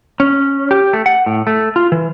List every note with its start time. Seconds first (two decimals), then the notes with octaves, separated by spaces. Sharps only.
0.20 C#4
0.71 G4
0.93 A3
1.06 F#5
1.26 A2
1.47 A3
1.76 F4
1.92 E3